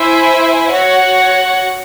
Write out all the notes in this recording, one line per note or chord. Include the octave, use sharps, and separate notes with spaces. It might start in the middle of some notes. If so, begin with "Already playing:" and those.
Already playing: E4 C5 E5 G#5
F#4 C#5 F#5